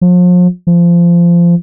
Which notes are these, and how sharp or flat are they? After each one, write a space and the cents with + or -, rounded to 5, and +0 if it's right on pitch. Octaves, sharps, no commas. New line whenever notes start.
F3 +40
F3 -20